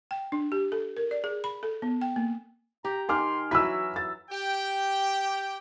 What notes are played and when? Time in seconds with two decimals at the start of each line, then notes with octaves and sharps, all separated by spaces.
0.11 G5
0.32 D4
0.52 G4
0.72 A4
0.97 A#4
1.11 D5
1.24 G#4
1.44 B5
1.63 A4
1.82 B3
2.01 G5
2.16 A#3
2.85 G4 A#5
3.09 D#3 G#5 C6 D6 F6
3.51 E3 F#3 F#4 B4 E6 B6
3.96 A6
4.30 G4 G5